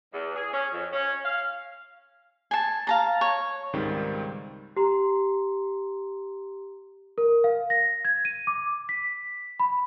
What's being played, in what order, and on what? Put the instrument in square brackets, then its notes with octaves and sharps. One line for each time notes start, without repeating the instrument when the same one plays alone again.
[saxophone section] E2
G#4
C#4
F2
C#4
F5
[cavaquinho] G#5 A5
F5 A5 A#5
C#5
[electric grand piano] C#2 G#2 D#3 G3 C4
[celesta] G4 A#5 C6
A#4
F5
A#6
G#6
D#7
D6
B6
B5